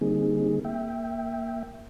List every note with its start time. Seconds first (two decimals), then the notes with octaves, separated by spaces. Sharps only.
0.01 D3 G3 A#3 C4 D#4 G#4
0.65 A#3 E5 G5